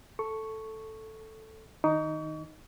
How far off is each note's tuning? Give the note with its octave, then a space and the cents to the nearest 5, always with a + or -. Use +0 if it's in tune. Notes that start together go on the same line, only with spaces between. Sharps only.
A4 +0 C#6 +0
D#3 +5 D#4 +0 C#6 +40